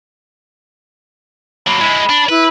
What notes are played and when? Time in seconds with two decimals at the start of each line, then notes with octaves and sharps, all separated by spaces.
1.67 F#3 A#3 B5
1.81 G#3 E4
2.09 D4
2.29 E4 B4